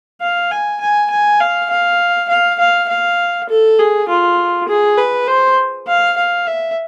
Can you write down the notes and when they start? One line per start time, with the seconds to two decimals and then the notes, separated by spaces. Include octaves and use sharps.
0.21 F5
0.51 G#5
0.81 G#5
1.10 G#5
1.40 F5
1.70 F5
2.29 F5
2.59 F5
2.89 F5
3.49 A4
3.79 G#4
4.09 F4
4.68 G#4
4.98 B4
5.27 C5
5.87 F5
6.17 F5
6.47 E5